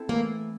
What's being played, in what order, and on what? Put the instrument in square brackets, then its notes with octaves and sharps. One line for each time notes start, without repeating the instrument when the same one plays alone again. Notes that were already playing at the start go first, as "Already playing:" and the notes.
Already playing: [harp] C4 E4 A4
[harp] E3 A3 [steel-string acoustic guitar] A#3